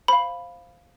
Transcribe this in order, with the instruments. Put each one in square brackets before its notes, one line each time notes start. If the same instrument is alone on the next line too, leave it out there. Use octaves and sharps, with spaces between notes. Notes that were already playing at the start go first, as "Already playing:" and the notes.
[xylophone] C5 F5 B5